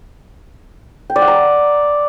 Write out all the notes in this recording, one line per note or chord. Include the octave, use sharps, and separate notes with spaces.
G5
D5
F#5
A#5